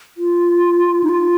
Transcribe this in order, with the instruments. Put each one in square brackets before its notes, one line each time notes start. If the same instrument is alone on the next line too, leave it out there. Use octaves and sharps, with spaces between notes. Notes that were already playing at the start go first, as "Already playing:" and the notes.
[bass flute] F4
D#4
F4